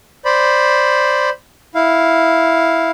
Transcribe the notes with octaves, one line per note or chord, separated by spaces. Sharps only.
C5 D5 B5
E4 F5